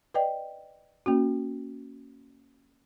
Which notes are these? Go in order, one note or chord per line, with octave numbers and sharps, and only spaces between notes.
B4 D5 D#5 G5
A#3 C#4 F#4